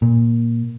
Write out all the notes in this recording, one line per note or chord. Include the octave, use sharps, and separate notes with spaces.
A#2